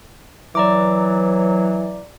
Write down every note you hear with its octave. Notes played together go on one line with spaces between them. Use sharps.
E3 F#3 D5 A#5 D6